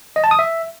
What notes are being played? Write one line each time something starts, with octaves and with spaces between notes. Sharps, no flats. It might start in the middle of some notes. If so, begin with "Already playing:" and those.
D#5
A5
D#6
E5